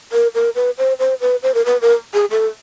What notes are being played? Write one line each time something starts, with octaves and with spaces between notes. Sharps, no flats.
A#4
A#4
B4
C5
C5
B4
C5
A#4
B4
A#4
G#4
A4